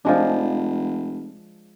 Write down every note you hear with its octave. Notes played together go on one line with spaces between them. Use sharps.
F1 F3 G#3 D4